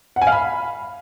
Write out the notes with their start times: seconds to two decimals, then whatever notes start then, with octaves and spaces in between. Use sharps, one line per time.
0.16 F#5
0.22 G#5
0.27 F5
0.32 B5